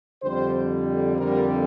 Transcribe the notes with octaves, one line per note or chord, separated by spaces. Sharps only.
F2 D3 G3 C5
F2 D3 G3 A#4